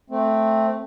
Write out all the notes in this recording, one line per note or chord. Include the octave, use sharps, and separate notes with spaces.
A3 C4